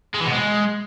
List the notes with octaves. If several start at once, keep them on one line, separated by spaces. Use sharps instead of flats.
G#3
E3
B2
G#3